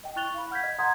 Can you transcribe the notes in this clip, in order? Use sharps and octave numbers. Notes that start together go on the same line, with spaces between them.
D#5 G5
E4 C#6 F#6 A6 F7 G7
F5 B5
F#5 F6 G6 G#6 B6
D#5
F#5 A#5 C6 D#6 G6 G#6